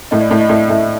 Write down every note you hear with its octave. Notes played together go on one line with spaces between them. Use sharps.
A2 D#5
D5
A2
D#5
A2 D5
A2 E5